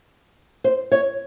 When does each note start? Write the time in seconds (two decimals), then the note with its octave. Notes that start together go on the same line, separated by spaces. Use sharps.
0.64 C5
0.92 C#5